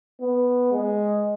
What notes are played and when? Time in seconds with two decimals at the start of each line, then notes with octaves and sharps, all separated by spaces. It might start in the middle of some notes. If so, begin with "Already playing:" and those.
0.21 B3
0.72 G#3